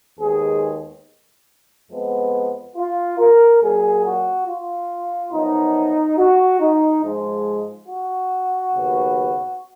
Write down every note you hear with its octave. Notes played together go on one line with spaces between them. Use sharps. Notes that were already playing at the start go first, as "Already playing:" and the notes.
D#2 D#3 G#3 B3 G#4
F2 F3 G#3 B3
F4
A#4
A#2 F#3 A#3 G#4
F#4
F4
F#2 F3 B3 D#4
F#4
D#4
G#2 F3 G#3
F#4
D#2 C#3 F#3 B3